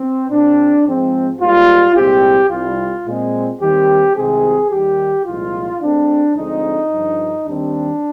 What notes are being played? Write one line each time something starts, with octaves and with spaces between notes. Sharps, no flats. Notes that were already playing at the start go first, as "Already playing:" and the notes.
Already playing: C4
A#2 G#3 C4 D4
G#2 F3 G#3 C4
G#2 G3 A#3 F4
C2 A#2 G#3 C4 G4
C2 C3 G3 F4
A#2 G#3 C4
D#2 D#3 G3 C4 G4
C2 C3 D#3 G#3 C4 G#4
D#2 D#3 G3 G4
C2 A#2 F3 G#3 F4
D2 D3 G#3 C4 D4
D2 D3 F3 G#3 C4 D#4
G2 D3 F3
D#2 D#3 G3 C4 D4